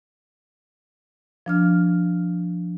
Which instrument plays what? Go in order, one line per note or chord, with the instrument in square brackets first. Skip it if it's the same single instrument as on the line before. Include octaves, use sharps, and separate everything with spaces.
[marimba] F3 D4 F6